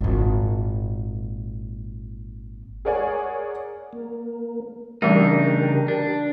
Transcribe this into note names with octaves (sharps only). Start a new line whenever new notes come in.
G#1 A#2
G#4 A#4 C#5 D5 F#5 G#5
A#3
C#3 E3 G3 A3 D4 D#4 G4 A#4
D4